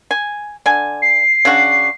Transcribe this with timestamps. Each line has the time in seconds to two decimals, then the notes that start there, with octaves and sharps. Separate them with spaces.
0.11 G#5
0.66 D3 G#5
1.02 C7
1.45 C#3 D4 F#4